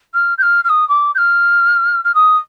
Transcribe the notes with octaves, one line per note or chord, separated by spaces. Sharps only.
F6
G6
F6
F6
D#6
D6
G6
F6
F6
D#6